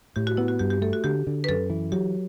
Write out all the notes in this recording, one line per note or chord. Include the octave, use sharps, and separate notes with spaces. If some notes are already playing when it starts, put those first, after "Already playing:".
A2 G4
F#4
B3 E4
F#4
G2 G4
G4
A3 A4
F#4
D3 G4
D3
B4
F#2 A4
E3
F#3 G4